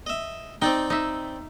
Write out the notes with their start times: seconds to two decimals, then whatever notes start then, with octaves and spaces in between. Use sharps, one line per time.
0.06 D#5 E5
0.62 C4 D#4 D5 G5
0.90 D#4 E5